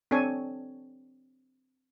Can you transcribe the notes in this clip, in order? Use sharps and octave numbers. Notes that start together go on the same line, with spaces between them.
C4 D4 A4 C#5 G#5